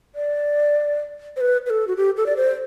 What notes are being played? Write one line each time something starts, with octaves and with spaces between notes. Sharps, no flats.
D5
C5
B4
B4
A4
F#4
G4
A4
D5
C5